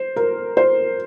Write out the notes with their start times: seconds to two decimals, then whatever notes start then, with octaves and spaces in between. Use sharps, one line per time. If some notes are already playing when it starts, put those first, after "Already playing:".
Already playing: C5
0.16 A#4
0.57 C5